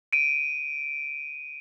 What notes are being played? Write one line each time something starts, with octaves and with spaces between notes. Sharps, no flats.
D7 D#7